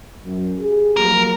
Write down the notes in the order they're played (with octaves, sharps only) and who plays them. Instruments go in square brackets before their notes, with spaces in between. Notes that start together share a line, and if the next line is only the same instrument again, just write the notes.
[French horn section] F#2
G4 G#4
[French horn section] F3 F#3 A#3 [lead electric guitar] A#4